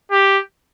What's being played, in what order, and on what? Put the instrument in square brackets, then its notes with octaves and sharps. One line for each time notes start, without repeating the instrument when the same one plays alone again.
[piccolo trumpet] G4